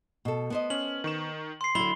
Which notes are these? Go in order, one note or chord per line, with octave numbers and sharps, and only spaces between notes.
B2 A4
B3 C5 D#5
C#4 F6 F#7
D#3 C#6 E7
C6 C7
D3 F#3 E4 B5 G7